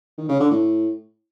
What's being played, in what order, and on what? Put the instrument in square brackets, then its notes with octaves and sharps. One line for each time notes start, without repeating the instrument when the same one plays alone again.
[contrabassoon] D#3
C#3
D3
A2